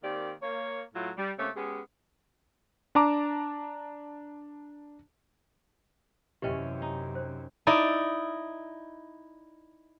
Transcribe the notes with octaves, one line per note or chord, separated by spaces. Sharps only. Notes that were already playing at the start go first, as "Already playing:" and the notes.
D#3 A#3 C4 G4 D5
A#3 C#5
A2 F#3 A3 F4
G3
C3 A3 A#3 C#4 C#5
G#3 B3 C#4 G4 G#4
D4 A5 A#5 D6
F#2 C3 E3 C#4 G4 D#5 G5
D#4
C5
D#4 E4 D5